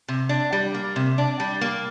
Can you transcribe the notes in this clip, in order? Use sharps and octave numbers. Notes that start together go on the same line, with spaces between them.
C3
D4
G3
A#3
C3
D4
G3
A#3